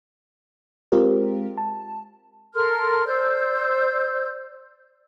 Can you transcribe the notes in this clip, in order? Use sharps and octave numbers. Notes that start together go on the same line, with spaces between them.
G#3 C4 F4 G4 A#4
A5
A4 A#4 C6 F6
C5 D5 E6 G6